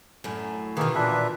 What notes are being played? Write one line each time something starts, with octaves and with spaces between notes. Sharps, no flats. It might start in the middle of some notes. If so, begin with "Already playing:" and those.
F#2 A2
B2 D#3 E3 A#3 G#4
A#2 D4 B4 E5